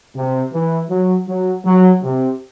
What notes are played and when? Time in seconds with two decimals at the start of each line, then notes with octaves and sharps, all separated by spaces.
0.16 C3
0.53 E3
0.90 F#3
1.27 F#3
1.65 F#3
2.03 C3